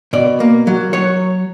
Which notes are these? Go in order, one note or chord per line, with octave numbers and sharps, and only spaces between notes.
B2 D5
A#3
F#3
F#3 C#5